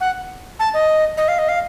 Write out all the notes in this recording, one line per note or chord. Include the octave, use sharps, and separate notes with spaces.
F#5
A5
D#5
D#5
F5
D#5
F5